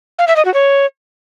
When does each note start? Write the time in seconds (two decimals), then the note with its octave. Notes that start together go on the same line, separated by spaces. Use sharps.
0.19 F5
0.27 E5
0.36 D#5
0.45 F#4
0.54 C#5